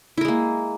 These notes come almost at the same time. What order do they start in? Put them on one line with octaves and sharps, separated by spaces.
E4 A#4 G#3 A#3